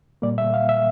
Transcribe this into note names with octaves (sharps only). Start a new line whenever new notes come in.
A#2 G3 A#3 D5
E5
F5
E5